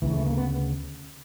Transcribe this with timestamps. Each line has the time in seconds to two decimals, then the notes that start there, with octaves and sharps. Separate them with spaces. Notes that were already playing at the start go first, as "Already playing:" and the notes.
0.02 D2 C#3 E3
0.13 A3
0.26 A#3
0.37 B3